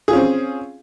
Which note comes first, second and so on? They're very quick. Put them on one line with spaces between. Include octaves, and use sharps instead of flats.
G#4 F4 C#4 C4